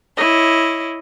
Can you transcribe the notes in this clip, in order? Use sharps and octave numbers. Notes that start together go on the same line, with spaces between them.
E4 C#5 D#5